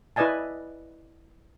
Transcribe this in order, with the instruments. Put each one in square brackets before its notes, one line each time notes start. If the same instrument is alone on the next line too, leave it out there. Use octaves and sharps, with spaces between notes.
[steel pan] E4 B4 D5 D#5 G#5 A5